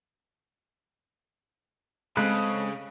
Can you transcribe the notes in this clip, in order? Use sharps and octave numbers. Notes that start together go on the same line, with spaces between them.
C#3 G#3 C4 A4 B5 F#6